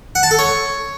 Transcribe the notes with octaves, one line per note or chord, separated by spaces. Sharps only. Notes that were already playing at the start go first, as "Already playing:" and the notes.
F#5
A5
A4
C#5